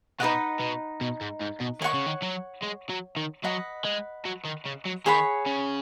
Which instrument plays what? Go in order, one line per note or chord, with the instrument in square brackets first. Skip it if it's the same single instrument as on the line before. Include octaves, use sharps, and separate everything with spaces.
[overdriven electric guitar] B2 [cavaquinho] D#4 B4 D#5 F#5
[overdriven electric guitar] B2
B2
G#2
G#2
B2
[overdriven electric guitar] D#3 [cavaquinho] C#5 F#5 C#6
[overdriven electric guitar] C#3
D#3
F#3
G#3
F#3
D#3
[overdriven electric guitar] F#3 [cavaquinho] B4 D#5 F#5 D#6
[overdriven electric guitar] G#3
F#3
D#3
C#3
F#3
[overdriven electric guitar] D#3 [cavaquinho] G#4 C#5 F#5 B5
[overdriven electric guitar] C#3